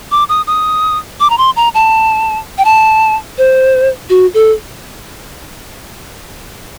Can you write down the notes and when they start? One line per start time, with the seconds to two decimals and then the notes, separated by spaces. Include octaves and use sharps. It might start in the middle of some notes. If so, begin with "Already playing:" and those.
0.11 D6
0.29 D#6
0.47 D#6
1.20 D6
1.30 A#5
1.38 C6
1.56 A#5
1.74 A5
2.58 G5
2.65 A5
3.38 C5
4.10 F#4
4.34 A4